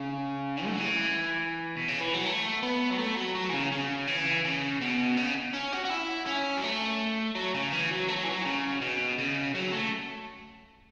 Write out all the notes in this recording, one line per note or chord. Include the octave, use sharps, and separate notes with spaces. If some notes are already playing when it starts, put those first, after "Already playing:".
Already playing: C#3
A3
F#3
E3
B2
C#3
E3
F#3
A3
B3
F#3
A3
F#3
F#3
E3
C#3
C#3
E3
C#3
B2
C#3
C#4
F#4
F#4
E4
C#4
F#3
A3
F#3
C#3
E3
F#3
A3
F#3
E3
F#3
C#3
B2
C#3
F#3
A3